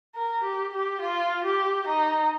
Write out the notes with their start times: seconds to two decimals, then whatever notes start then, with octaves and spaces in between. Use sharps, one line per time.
0.15 A#4
0.44 G4
0.73 G4
1.01 F4
1.44 G4
1.87 D#4